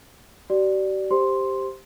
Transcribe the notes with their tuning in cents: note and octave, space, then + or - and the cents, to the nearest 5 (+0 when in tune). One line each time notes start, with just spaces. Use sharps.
G4 -45 D5 +0
G4 +0 C5 +0 C6 +0